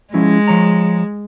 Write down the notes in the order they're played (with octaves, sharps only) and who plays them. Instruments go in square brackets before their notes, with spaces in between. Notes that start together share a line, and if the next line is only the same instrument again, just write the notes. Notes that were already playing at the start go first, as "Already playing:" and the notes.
[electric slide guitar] F3 C#4 E4 [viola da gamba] G#3
[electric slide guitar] F3 C#5 A#5